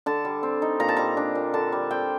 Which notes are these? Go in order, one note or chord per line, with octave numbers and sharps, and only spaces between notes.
D3 A5
G3
C4
D#4
A#2 A#5
A5
G3 A#5
D4
A#2
D3 A5
G3
C4 G5